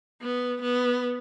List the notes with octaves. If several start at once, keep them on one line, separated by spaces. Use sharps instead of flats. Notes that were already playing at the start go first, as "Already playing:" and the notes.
B3
B3